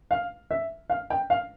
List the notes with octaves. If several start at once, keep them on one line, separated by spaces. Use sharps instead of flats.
F5
E5
F5
G5
F5